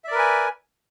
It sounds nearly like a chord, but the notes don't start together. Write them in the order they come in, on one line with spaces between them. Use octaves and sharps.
E5 D5 A#4 B4 G#5